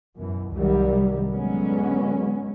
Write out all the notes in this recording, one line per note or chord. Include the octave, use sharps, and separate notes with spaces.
F#2 B2 E3
C2 G2 C3 D#3 F#3 G3
D3 F#3 G#3 B3 C#4